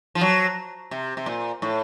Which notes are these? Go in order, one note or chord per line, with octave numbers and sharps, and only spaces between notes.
F3
F#3
C3
C3
A#2
A2